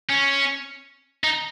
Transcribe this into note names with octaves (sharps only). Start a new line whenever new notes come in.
C#4
D#4